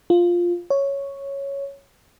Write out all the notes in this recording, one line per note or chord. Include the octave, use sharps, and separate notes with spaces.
F4
C#5